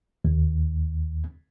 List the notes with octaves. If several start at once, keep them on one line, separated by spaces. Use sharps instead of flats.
D#2